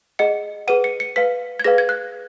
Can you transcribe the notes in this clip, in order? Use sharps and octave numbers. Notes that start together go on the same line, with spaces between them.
G#4 D#5 F#5 C#7
G#4 B4 F#5 D#7
C#7
C#7
B4 F5 B6
G#6
G#4 B4 F5 A#6
G#6
F#6